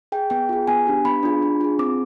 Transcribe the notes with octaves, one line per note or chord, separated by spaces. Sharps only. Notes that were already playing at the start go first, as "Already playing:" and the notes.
G#4 G5
B3 G5
F4 G#4
B3 G#5
D4 G4
B3 B5
D4 F4 G#4
D4
F4 G#4
C4 D6